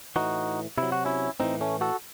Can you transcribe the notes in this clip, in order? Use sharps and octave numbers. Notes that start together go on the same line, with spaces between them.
A2 E3 D#4 F#4
C3 F#3 E4
F#4
C#4 E4
A2 E3 C4 D#4
A3 C#4
F#4 A4